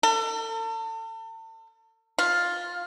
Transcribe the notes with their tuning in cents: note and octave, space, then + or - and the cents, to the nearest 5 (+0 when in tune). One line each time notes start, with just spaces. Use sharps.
A4 +40
F4 +10